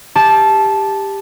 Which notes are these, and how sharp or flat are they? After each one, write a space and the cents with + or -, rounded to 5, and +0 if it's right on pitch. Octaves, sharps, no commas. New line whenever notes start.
G4 +15 A5 -10